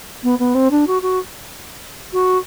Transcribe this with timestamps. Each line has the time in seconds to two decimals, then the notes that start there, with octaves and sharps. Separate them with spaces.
0.23 B3
0.39 B3
0.55 C4
0.71 D4
0.87 F#4
1.02 F#4
2.13 F#4